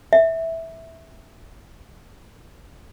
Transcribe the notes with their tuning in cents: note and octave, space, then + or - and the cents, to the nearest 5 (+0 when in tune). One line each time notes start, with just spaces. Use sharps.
E5 -10